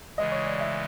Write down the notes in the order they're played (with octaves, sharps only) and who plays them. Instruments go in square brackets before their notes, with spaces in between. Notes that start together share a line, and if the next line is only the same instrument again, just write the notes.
[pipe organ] C#3 E3 G#3 [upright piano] D#5
[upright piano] C#5
D5
E5